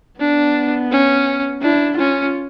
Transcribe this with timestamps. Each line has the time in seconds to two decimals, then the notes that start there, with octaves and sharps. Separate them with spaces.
0.20 B3 D4
0.92 C#4
1.62 D4 E4
1.98 C#4 F4